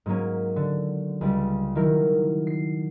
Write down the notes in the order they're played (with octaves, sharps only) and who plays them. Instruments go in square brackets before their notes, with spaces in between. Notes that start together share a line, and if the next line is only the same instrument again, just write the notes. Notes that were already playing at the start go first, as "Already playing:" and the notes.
[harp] G#2 F#3 A#3 C#4
D3
C#2 G3
D#3 F#3 E4 A#4
C7